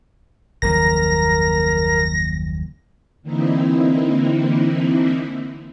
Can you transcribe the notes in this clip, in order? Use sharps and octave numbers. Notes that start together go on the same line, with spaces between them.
F#1 D#2 F3 A#4 A#6
D3 E3 A#3 C4 D#4 E4